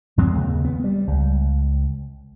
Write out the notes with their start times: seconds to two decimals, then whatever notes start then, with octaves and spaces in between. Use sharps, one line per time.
0.18 F#2 F3 G#3 C4
0.32 D#2 C#3
0.65 B3
0.84 G3
1.07 C#2